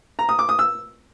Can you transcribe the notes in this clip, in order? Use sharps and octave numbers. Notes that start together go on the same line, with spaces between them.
A#5
D#6
D6
D#6
E6